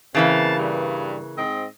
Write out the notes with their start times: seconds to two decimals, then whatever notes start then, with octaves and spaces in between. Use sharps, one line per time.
0.15 C#3 E3 A#3 C4 F5 A5
0.56 G2
1.37 G#2 C4 D#5